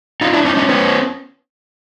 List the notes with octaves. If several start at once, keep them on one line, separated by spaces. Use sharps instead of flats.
D#4 F4
D4 E4
C#4 D#4
C#4 D#4
B3 C#4